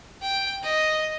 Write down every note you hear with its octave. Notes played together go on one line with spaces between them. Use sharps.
G5
D#5